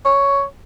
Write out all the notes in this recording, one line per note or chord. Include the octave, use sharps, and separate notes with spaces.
C#5